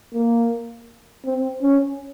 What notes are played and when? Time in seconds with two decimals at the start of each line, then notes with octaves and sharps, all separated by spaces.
0.14 A#3
1.25 C4
1.62 C#4